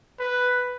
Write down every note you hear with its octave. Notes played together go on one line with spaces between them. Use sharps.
B4